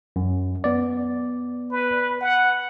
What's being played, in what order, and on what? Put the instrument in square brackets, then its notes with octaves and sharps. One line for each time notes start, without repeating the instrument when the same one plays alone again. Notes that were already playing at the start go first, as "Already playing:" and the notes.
[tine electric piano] F#2
B3 D5
[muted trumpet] B4
F#5